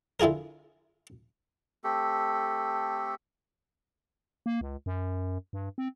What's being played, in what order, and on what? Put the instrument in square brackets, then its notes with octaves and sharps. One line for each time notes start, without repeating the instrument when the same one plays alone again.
[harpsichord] D3 E4 F4 G#4 A#4
[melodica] A3 C4 G4 A4
[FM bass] A#3
C#2
F#2
G2
C4